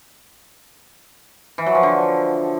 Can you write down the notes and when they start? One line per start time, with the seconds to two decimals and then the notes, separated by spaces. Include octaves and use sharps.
1.58 E3
1.66 F#3
1.75 F3
1.83 D3